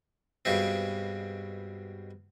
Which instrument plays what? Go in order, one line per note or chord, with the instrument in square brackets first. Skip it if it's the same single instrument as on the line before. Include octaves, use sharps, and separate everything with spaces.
[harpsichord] G2 B2 G#3 C4